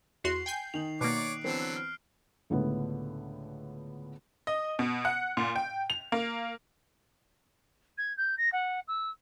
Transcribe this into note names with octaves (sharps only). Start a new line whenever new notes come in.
E2 F#4 C6 C7 F7 F#7
G5 G#5 G6
D#3 D#4 F7 F#7
B2 A#3 C#5 D5 D6 F#6 C7 D7
D3 E3 F#3 B3 C4 A4 C7
F6
C#2 A2 D3 B3
D#5
B2
F#5
A#2
G5
F7
A#3
G#6
G6
A#6
F#5
E6